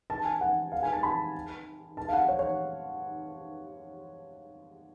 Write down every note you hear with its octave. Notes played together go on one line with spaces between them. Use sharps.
A5
G#5
F#5
F5
G#5
A5
B5
A5
F5
F#5
C#5
C#5